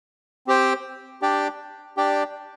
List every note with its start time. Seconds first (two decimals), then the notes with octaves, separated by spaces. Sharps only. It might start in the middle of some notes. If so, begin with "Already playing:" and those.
0.47 C4 G4 C5 G5
1.22 D4 G4 D5 G5
1.97 D4 G4 D5 G5